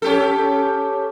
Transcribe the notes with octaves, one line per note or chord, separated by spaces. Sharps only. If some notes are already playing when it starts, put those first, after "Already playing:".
C#4 G4 A4